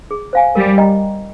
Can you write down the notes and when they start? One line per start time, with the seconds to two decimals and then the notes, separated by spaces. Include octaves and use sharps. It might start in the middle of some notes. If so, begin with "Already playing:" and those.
0.11 G#4
0.33 C5 F5 G#5
0.55 G3 A#4
0.78 D#5 G5 A#5